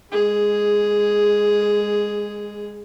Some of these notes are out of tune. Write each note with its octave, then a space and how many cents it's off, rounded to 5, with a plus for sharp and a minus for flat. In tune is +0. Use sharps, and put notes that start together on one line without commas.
G#3 -15 G#4 +0